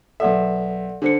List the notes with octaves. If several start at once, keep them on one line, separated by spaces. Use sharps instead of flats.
B1 A4 D5 E5 F#5
D3 D4 C5 C#7